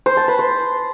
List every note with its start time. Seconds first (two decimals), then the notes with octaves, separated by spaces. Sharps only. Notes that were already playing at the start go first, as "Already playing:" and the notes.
0.06 C5
0.17 A5
0.28 B4
0.39 C5